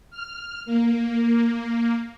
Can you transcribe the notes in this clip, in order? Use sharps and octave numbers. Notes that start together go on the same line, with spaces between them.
F6
A#3